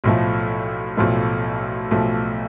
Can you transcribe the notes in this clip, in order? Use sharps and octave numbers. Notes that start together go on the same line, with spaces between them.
B1 A2 F3 A3
B1 A2 F3 A3
B1 A2 F3 A3